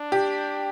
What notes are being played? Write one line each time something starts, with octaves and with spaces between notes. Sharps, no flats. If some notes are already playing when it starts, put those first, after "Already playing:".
Already playing: D4
G4